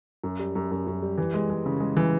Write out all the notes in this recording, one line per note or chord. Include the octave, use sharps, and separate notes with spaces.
F#2
G3
F#2
F#2
F#2
G3
E3
G#3
G#3
C#3
G#3
E3